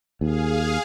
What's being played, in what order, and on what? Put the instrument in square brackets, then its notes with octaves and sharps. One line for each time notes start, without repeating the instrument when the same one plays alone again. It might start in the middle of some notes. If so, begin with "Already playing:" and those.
[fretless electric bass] D#2 [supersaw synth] G#4 F5